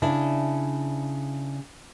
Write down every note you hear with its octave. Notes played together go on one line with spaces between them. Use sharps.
C#3 D4 E4